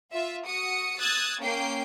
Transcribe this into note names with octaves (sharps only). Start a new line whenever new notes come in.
F4 E5
F#4 D#6 C#7
D#6 E6 F#6 G#6 A6
A#3 C#4 G5 C7